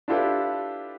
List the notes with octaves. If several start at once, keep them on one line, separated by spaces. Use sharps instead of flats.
D4 E4 F4 G4 A4 B4